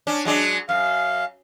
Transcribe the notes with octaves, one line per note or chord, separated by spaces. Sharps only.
C#4 D4
F#3 G#3 D4
F#2 F5